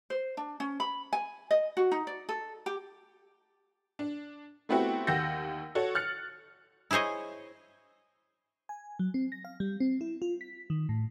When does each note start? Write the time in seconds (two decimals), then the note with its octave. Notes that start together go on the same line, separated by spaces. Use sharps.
0.10 C5
0.37 D4
0.60 C#4
0.80 B5
1.13 G#5
1.51 D#5
1.77 F#4
1.91 D#4
2.07 D5
2.29 A4
2.66 G4
3.99 D4
4.69 A3 B3 C4 E4 F#4 G4
5.07 D#2 G4 F#5 E6 G6 A#6
5.75 F#4 A4 C#5
5.95 F6 F#6 A6 C#7
6.91 E4 G#4 C5 C#5 D#5
8.69 G#5
8.99 F#3
9.14 C4
9.32 A#6
9.45 F5
9.60 G3
9.80 C4
10.01 E4
10.22 F4
10.41 B6
10.70 D#3
10.89 A2